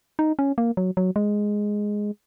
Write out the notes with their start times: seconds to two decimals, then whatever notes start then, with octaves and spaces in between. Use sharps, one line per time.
0.19 D#4
0.39 C#4
0.58 A#3
0.77 F#3
0.97 F#3
1.16 G#3